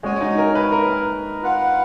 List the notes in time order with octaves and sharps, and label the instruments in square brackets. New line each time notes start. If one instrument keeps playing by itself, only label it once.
[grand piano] G#3 [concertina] C#4 F#4 C#5 G#5
[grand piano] D#4
A#4
B4
A#4
[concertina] F4 B4 F#5